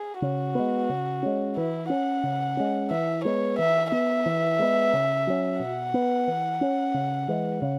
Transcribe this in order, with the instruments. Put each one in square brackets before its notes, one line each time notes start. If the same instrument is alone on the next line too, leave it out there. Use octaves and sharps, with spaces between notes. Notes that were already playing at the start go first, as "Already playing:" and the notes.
Already playing: [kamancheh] G#4
[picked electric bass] C#3 [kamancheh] F#4
[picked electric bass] G#3 B3
C#3
G#3 C#4
[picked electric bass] E3 [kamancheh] E4
[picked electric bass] C#4 [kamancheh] F#5
[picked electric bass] C#3
G#3 C#4
[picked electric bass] E3 [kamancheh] E5
[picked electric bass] G#3 B3 [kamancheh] C#5
[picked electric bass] E3 [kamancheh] E5
[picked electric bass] B3 [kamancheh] E5
[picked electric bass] E3
G#3 B3
C#3
F#3 C#4
[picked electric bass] B2 [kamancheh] F#5
[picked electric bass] B3
E3
C#4
C#3
E3 G#3
C#3